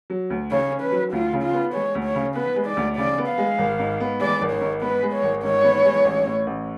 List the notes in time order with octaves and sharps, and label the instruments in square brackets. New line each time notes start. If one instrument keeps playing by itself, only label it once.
[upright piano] F#3
D2
[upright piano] C#3 [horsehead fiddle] C#5
[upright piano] C#4
[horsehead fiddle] B4
[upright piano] F#3
[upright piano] D2 [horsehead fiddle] F4
[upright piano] C#3
[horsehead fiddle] F4
[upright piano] B3
[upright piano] G#3 [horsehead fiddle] C#5
[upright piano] D2
[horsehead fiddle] C#5
[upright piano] C#3
[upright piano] B3 [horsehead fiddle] B4
[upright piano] G#3
[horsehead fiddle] D5
[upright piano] D2
[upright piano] C#3 [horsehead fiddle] D5
[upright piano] B3
[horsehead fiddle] F5
[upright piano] G#3
G#1
G#2
B3
[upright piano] G#3 [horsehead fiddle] D5
[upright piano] G#1
[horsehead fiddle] C#5
[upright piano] G#2
[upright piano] B3 [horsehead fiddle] B4
[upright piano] G#3
[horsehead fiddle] C#5
[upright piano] G#1
[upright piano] G#2 [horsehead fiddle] C#5
[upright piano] B3
G#3
A1
A2
A1